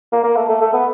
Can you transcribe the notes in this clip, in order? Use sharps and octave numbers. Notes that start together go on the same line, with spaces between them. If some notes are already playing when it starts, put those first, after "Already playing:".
A#3
A#3
A3
A3
A3
B3